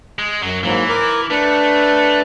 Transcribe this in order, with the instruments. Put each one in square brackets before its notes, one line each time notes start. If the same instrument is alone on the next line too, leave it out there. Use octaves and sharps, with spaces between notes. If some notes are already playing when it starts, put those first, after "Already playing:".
[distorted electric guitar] G#3
[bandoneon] F#2 [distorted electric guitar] F#3
[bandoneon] G#2 F#3 A#3 [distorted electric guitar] E3
[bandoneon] A#4 D6
[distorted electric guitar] A3 [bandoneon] D4 B4